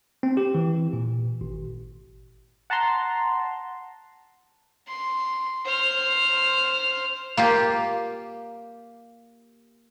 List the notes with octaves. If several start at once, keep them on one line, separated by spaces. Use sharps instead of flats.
C4
G4
E3
A#2
G#1
F#5 A5 A#5 C6
C6
C5 F6
A#3 F4 G4